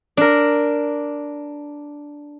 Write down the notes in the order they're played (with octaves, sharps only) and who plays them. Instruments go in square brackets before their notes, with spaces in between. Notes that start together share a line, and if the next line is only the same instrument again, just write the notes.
[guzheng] D4 A#4